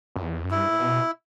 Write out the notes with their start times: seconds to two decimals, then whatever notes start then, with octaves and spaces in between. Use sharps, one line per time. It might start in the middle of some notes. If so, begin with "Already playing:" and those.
0.16 F#2
0.22 E2
0.44 F#2
0.51 G2 E4
0.68 A2
0.79 B2